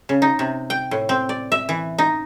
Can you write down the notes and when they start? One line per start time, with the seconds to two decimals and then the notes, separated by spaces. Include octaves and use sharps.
0.09 C#3
0.22 D#4
0.39 C3
0.70 G5
0.91 A2
1.09 C4
1.29 D5
1.52 E5
1.69 E3
1.98 D#4